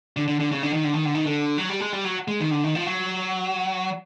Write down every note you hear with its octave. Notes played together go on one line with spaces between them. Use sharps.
D3
D3
D3
C#3
D3
D#3
D3
D#3
D3
D#3
D3
F#3
G3
G#3
G3
F#3
G#3
D#3
D3
D#3
F3
F#3